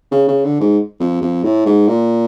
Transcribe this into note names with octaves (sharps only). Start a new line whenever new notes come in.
C#3
C#3
D3
G#2
F2
F2
A2
G#2
A#2